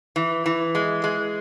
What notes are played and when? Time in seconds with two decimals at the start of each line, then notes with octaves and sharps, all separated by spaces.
0.16 E3
0.46 E3
0.75 G#3
1.04 G#3